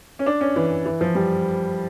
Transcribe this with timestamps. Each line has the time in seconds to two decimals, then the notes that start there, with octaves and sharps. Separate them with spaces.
0.19 C#4
0.26 D4
0.41 C#4
0.56 E3
0.86 E3
1.01 F3
1.15 G3